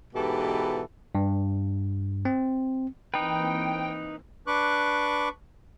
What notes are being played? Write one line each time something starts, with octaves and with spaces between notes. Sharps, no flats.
G#2 B2 E3 G4 A4
G2
C4
E3 A#3 C4 D#4 B4 G5
D4 B4 C#6 D6 F#6